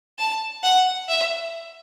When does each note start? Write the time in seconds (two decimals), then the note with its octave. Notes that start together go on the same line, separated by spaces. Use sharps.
0.18 A5
0.63 F#5
1.08 E5